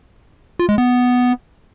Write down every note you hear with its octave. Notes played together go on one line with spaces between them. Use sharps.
F4
G#3
B3